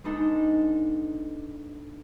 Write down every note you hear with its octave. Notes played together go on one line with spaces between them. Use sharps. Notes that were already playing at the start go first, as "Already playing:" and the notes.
G#3 B3 D4 D#4 A4